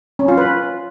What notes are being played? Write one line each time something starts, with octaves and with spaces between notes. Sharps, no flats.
C#4
F4
B4